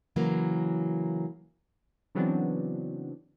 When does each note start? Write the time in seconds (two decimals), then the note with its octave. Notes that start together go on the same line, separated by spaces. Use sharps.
0.16 C#3 E3 F#3 A#3
2.15 C#3 E3 F#3 B3 C4 D4